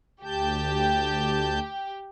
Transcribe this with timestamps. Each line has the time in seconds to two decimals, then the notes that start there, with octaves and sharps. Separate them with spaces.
0.24 D2 G4 A5 G6